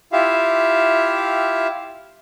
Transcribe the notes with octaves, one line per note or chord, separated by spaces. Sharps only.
E4 F4 G4 E5 F5